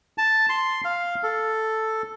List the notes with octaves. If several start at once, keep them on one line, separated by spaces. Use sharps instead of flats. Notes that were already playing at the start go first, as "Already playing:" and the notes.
A5
C6
F5
A4